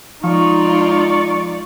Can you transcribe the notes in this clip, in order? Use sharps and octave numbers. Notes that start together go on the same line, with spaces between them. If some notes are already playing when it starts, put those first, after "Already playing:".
F3 G#3 D#4 F4 D5 C#6